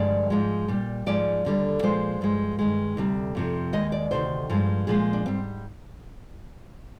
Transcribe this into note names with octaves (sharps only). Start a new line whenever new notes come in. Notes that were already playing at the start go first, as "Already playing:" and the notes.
Already playing: G2 D3 F3 G#3 D5
G#2 F3 G#3
A#2 G3
G#2 F3 G#3 D5
D#2 D3 G3
A#2 F3 G#3 C5
G2 F3 G#3
G2 D#3 G#3
D2 C3 G3
F2 C3 F3
D#2 D#3 G#3 D#5
D5
D2 C3 D#3 C5
G2 F3 G#3
A#2 F3 G#3 G#4
D4
G#2 G3 C4